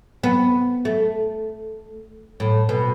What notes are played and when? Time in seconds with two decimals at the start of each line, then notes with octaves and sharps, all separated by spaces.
0.23 B3
0.85 A3
2.40 A2
2.69 B2